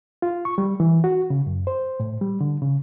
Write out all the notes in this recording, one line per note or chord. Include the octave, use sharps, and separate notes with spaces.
F4
C#6
G3
E3
F#4
C#3
F#2
C5
A2
G3
D3
C#3